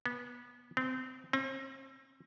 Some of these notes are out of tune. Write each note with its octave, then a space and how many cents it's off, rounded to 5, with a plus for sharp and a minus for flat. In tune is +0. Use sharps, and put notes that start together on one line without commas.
B3 -20
C4 -25
C4 +40